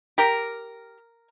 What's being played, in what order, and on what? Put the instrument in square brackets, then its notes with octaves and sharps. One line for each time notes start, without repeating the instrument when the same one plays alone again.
[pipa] G4 A#4